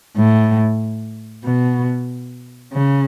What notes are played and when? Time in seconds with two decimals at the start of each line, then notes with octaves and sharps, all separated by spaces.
0.17 A2
1.44 B2
2.73 C#3